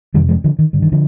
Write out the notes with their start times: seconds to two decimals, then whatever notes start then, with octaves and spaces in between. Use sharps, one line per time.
0.14 F2 C3 D#3 G3
0.29 F3 G#3
0.44 D3 F3
0.59 D#3
0.73 G2 D3
0.82 D#3
0.92 D3 F3